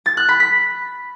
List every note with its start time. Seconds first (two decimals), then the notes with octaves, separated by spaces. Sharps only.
0.06 A6
0.17 F#6
0.29 B5
0.40 B6